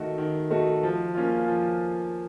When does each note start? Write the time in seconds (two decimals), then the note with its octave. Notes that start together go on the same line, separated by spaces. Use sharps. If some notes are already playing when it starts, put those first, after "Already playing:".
Already playing: D#3 A3 D#4 F#4
0.18 D#3
0.50 A3 D#4 F#4
0.83 F3
1.15 A#3 C#4 F4
1.48 F3